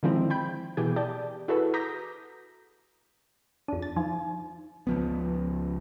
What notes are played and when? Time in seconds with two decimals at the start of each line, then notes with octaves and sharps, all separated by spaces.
0.03 D3 D#3 F3 G#3 C4 E4
0.30 G5 B5 G6
0.77 B2 E3 G4 G#4 G6
0.96 G4 D5 A5 G6
1.48 E4 F#4 G#4 A4 B4
1.74 A#5 D6 D#6 G6 A#6 B6
3.68 F2 D4 F4 A5
3.82 A6
3.96 F3 D#4
4.87 C#2 F3 B3